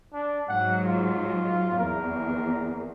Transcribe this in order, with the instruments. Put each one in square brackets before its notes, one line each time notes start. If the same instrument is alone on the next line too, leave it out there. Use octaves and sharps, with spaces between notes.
[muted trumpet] D4
[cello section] G#2 F#3 [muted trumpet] F#5
[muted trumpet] F4
[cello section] E2 [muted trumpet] A#4